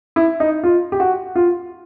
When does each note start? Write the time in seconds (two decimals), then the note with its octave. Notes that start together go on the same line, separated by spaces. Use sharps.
0.16 E4
0.40 D#4
0.64 F4
0.92 G4
1.00 F#4
1.36 F4